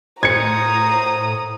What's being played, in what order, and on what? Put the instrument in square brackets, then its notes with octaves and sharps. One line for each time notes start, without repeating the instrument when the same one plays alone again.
[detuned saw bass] A2 [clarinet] C5 [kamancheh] A#5 D#6 [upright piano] G#6 C#7